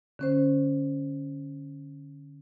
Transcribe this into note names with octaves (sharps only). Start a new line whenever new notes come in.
D3 C#4 C5